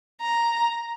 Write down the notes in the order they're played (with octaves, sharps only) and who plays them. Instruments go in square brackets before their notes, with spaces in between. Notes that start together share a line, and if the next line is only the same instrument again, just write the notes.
[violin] A#5